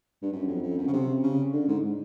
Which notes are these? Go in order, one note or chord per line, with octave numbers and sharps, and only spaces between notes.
G2
F#2
F2
F2
F#2
C#3
C3
C#3
D3
G#2